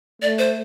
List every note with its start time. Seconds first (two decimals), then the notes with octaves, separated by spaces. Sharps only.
0.22 A3 D5
0.38 C5